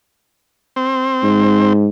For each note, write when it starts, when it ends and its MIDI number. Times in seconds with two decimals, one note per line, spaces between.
0.76 1.73 60
1.23 1.89 44